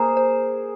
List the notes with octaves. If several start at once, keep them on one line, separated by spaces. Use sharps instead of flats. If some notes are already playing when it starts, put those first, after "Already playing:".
Already playing: A#3 G#4 A#4 C5
C5